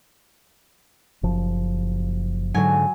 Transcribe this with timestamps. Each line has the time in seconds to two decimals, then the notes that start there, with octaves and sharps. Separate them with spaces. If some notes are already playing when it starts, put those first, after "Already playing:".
1.23 F#1 F3
2.54 G#2 D3 F#3 G#5